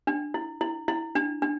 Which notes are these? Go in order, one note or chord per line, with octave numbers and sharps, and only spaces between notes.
D4
E4
E4
E4
D4
D4